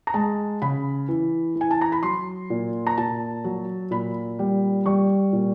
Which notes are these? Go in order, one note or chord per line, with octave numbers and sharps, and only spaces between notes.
A#5
G#3 A5
C#3 B5
E3
E3
G#5
A5
A#5
B5
F#3 C6
A#2
A#5
A#2 A5
F#3
A#2 B5
G3
G3 C#6
A#2